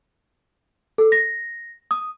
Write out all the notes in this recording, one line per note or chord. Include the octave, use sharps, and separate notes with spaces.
A4
A#6
D#6